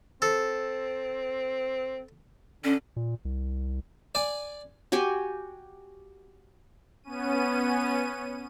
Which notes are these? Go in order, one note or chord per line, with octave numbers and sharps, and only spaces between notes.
C4 A4
D3 C#4
A#2
C2
D5 G#5
F#4 G4 G5 G#5
B3 C#4 D#7